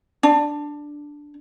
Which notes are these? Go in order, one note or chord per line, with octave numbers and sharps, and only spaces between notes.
D4